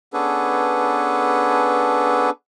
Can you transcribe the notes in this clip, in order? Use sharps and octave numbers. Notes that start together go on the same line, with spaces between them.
B3 C#4 D4 G#4 A4 B4